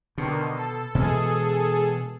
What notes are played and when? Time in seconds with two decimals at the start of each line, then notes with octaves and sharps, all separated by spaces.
0.18 B2 D3 D#3
0.56 A4
0.95 B2 E3 G#3 G#4 A4